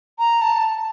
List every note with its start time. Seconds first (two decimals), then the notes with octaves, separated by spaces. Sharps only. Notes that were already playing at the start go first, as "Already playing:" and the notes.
0.19 A#5
0.41 A5